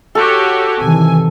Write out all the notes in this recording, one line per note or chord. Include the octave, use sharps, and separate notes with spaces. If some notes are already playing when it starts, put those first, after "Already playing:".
F#4 G4 A4 C#5
C3 D#3 E3 G#5